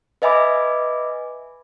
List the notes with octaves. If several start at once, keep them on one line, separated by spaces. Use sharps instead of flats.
B4 D#5 E5 G#5 B5 D6